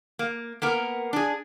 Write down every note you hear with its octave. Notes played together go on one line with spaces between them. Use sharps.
A#3
A#3 B3 A#4
D4 G#4